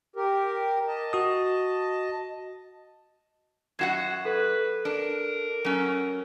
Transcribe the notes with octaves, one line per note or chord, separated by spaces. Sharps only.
G4 A#4
D#5 A5
F#4 D#6
F#2 F#4 F#5 G#6 C7 E7
A4 B4
D4 A#4
F#3 C#4